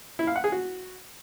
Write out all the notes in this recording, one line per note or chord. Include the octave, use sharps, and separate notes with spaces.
E4
F5
F#5
G#4
F#4